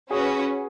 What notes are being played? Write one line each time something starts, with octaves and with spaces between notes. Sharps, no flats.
C#4 F#4 G#4 B4